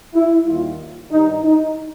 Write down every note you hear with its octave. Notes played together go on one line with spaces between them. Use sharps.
E4
D#2 D#3 G3 F4
G2 D#3 G3 D#4
D#4